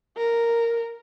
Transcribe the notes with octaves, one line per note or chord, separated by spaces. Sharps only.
A#4